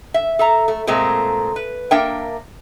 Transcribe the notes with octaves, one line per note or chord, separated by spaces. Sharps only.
E5
A4 E5 A#5
A3
A#2 G#3 A3 C4 A#4
B4
A#3 D4 A#4 E5 G5